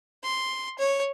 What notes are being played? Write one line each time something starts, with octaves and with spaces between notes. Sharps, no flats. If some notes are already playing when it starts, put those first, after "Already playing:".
C6
C#5